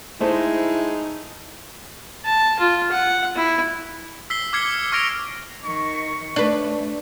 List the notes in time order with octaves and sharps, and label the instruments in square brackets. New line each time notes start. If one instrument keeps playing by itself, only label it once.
[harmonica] G#3 D#4 [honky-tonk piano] A3 C5 [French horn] E4
[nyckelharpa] A5
F4
F#5
E4
[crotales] E6 B6 C7 G7
D6 F6 G#6 C7 C#7
C#6 F6 G#6 A#6 D7 F7
[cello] D#3 [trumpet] C#6
[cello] A3 [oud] D4 B4